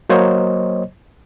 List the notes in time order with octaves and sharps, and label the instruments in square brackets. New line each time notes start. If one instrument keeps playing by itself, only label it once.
[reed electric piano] F#3 A#3 C5 C#5 D#5